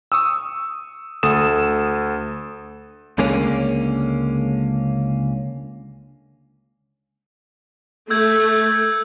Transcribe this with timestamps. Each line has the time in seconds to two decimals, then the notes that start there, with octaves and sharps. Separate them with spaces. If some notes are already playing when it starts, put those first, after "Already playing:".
0.12 C#6 D#6 E6
1.23 D2 A4 D#6 E7
3.18 C#2 D3 G#3 A#3 C#4
8.10 A3 E6 G6 G#6